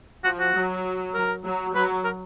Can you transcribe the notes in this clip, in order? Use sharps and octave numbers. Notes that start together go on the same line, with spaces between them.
F3 F#4
F#4
F#3
A#4
F#3
F#3 B4
A#4